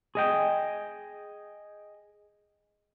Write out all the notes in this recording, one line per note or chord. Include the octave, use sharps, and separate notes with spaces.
G#4 D#5 G5